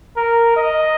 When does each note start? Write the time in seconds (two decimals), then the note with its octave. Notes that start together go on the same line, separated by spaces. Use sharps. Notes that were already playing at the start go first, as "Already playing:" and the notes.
0.17 A#4
0.56 D#5